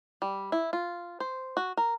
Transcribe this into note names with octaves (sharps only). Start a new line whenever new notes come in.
G3
E4
F4
C5
F#4
A#4